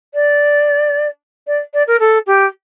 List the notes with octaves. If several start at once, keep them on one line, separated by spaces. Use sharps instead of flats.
D5
D5
D5
A#4
A4
G4